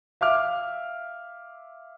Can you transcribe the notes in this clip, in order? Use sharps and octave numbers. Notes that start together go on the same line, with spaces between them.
E5 F5 D6 F6